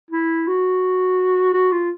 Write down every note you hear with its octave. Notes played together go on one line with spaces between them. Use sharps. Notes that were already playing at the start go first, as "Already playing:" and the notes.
E4
F#4
F#4
F4